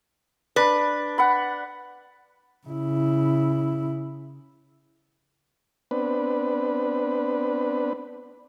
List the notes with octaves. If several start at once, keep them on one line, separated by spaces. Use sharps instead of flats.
D4 B4
F#5 B5
C#3 E4
B3 C4 D4 B4